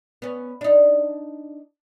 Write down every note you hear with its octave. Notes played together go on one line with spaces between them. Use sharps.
B3 C#4
D4 D#4